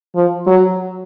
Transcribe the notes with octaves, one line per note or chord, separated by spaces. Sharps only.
F3
F#3